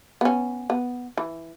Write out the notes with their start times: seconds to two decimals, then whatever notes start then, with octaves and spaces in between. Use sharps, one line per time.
0.21 B3 C#4
0.70 B3
1.17 E3